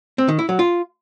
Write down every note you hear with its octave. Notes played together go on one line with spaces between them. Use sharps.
C4
D#3
E4
F#3
F4